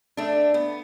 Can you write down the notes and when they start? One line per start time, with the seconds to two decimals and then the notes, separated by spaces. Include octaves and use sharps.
0.17 A3 D4
0.54 B3